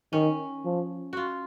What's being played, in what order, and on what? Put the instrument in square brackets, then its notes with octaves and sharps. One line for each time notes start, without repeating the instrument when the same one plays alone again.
[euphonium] D#3 [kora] C#4
[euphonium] F3
[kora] F4 F#4